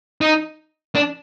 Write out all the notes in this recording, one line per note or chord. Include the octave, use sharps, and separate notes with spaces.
D#4
D4